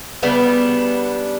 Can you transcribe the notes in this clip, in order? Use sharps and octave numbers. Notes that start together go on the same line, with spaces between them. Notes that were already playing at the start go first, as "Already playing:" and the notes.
C#3 G3 B3 D4